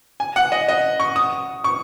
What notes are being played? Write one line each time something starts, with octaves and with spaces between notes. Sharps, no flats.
G#5
F#5
D#5
D#5
C#6
D#6
C#6